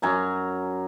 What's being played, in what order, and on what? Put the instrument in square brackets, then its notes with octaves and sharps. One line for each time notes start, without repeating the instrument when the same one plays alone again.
[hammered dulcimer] F#2 G#5 A#5